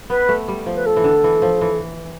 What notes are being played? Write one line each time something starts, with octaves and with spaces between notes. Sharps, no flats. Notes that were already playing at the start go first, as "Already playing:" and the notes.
B3 B4
A3
G3
F3
B4
A4
E3
D3
E3
F3
E3